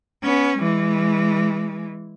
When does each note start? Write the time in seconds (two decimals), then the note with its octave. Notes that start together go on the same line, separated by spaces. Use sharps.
0.23 B3 C#4
0.59 E3 G#3